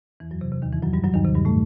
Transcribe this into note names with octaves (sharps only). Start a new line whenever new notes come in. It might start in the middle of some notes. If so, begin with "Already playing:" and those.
E2 E3
F#2 F#3
C3
C3
D#2 D#3
E2 E3
F#2 F#3
G2 G3
F#2 F#3
D#2 D#3
C3
G2 G3
A2 A3